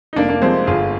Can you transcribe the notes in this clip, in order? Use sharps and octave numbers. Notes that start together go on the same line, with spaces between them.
D#4
F1 A#3 D4
A#3 D4
F2 C3 G#3 C4
G1 F4 G#4